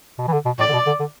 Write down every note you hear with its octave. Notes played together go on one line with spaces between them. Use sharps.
B2
E3
D3
B2
A2 D5
D3
B2
D3
D3